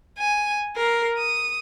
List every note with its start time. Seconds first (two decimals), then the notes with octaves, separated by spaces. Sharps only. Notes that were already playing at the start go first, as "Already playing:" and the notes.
0.19 G#5
0.76 A#4 C7
1.17 D#6